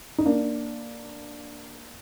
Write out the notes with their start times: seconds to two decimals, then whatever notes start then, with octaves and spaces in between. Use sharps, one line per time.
0.18 D#4
0.26 A#3 D4